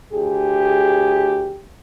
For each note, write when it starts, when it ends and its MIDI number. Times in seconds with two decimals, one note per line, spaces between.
0.13 1.61 38
0.13 1.61 67
0.13 1.61 68